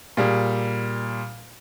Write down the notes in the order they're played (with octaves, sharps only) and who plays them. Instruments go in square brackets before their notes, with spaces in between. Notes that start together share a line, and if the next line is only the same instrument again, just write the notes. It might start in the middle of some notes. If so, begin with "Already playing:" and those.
[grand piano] A#2 G3 G#4